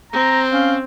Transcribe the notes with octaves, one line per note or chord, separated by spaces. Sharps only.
C4 A#5
C#4 F5